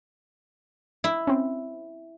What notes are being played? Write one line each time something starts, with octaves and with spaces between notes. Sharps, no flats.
E4
C4 C#4